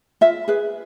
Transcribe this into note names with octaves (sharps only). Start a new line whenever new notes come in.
F4 E5
G#4 B4